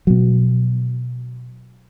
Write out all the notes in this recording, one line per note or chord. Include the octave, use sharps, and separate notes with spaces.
B2 F#3